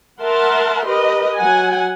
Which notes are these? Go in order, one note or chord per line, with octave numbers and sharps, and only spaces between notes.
A#4 E5 F#5 A5 C6
G4 A#4 B4 D#5
F#3 F#5 G#5